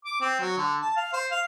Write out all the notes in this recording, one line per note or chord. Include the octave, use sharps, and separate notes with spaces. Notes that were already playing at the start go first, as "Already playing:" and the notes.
D6
C4
F#3
D3
A5
F5
C5
F5